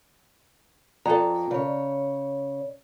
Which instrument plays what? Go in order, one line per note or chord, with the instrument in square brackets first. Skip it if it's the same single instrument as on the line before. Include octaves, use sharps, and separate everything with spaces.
[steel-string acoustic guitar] F2 [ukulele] A4 B4 A#5
[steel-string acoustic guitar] C#3 C#5